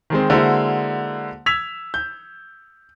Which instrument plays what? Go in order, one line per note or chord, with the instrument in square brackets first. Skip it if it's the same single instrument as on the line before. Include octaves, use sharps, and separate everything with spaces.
[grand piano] D#3 G#3 C4
D3 G#3 A#3 E4 F#4 C5
E6 G#6 B6 F7
G6